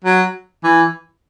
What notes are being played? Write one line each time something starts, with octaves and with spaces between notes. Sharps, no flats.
F#3
E3